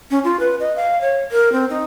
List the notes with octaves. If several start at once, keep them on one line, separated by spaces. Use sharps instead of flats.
C#4
F4
B4
D#5
F5
C#5
A#4
C4
D#4